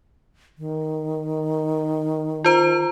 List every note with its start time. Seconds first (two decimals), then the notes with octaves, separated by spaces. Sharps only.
0.58 D#3
2.44 F4 C5 A#5